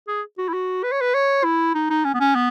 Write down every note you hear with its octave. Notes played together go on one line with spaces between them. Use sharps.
G#4
F#4
E4
F#4
B4
C#5
B4
C#5
E4
D#4
D#4
C#4
B3
C#4
B3